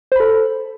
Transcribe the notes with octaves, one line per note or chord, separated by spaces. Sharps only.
A4 C5 B5